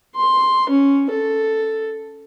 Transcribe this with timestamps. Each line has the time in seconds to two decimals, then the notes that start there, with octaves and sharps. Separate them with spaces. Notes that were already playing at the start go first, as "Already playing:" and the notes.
0.16 C6
0.70 C#4
1.10 A4